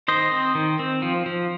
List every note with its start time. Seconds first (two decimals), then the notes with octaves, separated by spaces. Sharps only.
0.08 D#3 C5 D#5
0.32 C4
0.55 D#3
0.79 C4
1.02 F3
1.26 F3